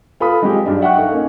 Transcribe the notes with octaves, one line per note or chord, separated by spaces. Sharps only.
F4 A4 B4 B5 D#6
G3 G#3 C4 F4 G4 G#4
G2 F#3 D4 D#4
E5 F#5 G5 C#6 F#6
D#4 A4 F5
A#3 C#4 D#4